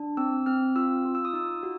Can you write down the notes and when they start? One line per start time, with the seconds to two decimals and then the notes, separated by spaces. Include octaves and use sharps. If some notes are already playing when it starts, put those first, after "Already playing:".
Already playing: D4
0.17 C4 E6
0.46 C4 F6
0.76 F4 E6
1.05 F4
1.15 E6
1.25 D#6
1.33 D#4 E6
1.63 F#4